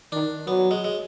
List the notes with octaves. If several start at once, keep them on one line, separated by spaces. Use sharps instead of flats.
D#3 D4
F#3 B3
G#3
G#3